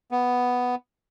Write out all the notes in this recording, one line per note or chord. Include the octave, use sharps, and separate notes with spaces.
B3